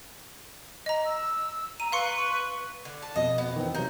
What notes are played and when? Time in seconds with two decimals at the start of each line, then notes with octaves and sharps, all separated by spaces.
0.86 D#5 A#5
1.05 E6
1.80 A#5 D#7
1.92 B4 F5 C6 C#6 C#7
2.85 D3
3.02 A5
3.16 F2 B2 D#5
3.38 B3
3.56 D#3 E3 C4
3.75 C3 F#3 D#4